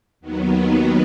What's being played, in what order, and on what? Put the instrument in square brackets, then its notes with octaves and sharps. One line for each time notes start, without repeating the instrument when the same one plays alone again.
[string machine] D#2 D#3 F#3 B3